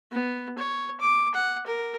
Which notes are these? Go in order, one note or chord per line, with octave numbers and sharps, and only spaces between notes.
B3
C#5
D6
F#5
A#4